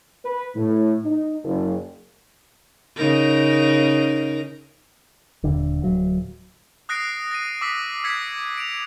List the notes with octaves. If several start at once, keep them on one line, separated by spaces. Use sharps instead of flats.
B4
A2
D#4
F#1
C#3 D#4 A#4
D#1 D3
D1 F#3
D#6 F#6 A#6 C7 D7
A#6 D#7
D6 E6 B6
E6 G#6 B6 C#7
D7 F7